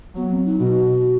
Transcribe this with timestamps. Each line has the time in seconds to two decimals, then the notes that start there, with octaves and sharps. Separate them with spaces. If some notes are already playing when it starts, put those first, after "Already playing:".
0.16 F#3 B3
0.31 C4
0.45 D#4
0.59 B2 F#4